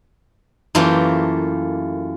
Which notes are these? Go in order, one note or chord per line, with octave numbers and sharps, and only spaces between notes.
F#2 E3 A3 A#3 F4 G4